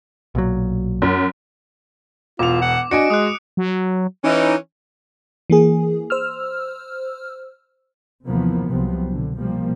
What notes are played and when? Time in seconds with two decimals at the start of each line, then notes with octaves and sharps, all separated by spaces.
0.35 B1 A#2 F#3
1.02 F#2
2.39 E1 F4 D6 F7
2.62 F#5
2.91 D4 F#4 D#5 G#5 C#7 D7
3.10 G#3 D#6 F#6
3.57 F#3
4.24 E3 C#4 D#4
5.50 E3 A#3 G#4
6.10 C5 E6 F6
8.27 D#2 C3 E3 F3 A#3 B3
8.70 C2 C3 F3 F#3 B3 C4
9.08 B2 D3
9.36 B2 F3 G3 A#3